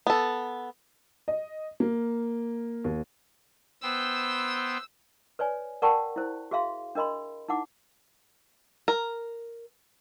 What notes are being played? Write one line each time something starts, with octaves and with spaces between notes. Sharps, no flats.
B3 A4
D#5
A#3
D#2
B3 C5 G5 E6
B4 C#5 D5 G#5
A#4 D5 F#5 G5 A5 C#6
E4 C5
F#4 G#4 E5 F5 C6
D4 A#4 D#5 B5 C6
D#4 E4 F#5 D6
A#4